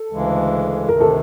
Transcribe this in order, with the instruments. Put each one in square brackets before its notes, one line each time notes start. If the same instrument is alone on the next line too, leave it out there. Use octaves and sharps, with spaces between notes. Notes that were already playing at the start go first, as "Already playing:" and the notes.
Already playing: [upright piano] A4
[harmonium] D2 C#3 E3 G#3
[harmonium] D2 C3 D#3 [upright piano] A#4
[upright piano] A4